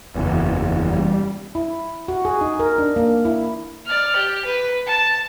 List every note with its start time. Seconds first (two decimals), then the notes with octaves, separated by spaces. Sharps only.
0.15 F#1 E2 E3
0.84 G3
1.55 E4
2.08 F#4
2.25 G#4
2.41 D#4
2.60 A#4
2.78 D4
2.96 A#3
3.25 E4
3.86 D5 F6
4.15 G4
4.45 B4
4.86 A5